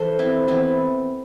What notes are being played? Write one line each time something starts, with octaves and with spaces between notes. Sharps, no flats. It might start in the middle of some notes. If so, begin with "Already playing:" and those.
Already playing: E3 A4 C5
C4 E4
E3 B3 C4 E4